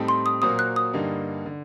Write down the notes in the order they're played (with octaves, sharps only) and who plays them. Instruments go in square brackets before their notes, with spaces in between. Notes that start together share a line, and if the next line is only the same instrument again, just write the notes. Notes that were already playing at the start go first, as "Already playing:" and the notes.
Already playing: [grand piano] A2 G3 C4 D#4 A4
[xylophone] C6
D#6
[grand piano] A#2 F#3 A#3 F#4 C5 [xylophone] D#6
[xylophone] F#6
D#6
[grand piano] G2 D3 G3 A#3 D#4
D3